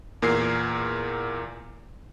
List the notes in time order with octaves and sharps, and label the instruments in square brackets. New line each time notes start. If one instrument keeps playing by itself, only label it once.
[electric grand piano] E2 A#2 A#4 G#6 C7